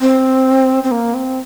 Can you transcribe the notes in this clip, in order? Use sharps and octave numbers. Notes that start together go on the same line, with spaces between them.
C4
C4
A#3
C4